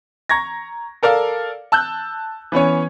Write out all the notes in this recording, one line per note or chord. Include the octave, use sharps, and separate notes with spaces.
A#5 C#6 G#6 A#6
A4 A#4 D5 F5
A5 E6 F#6 G6
E3 B3 C#4 C#5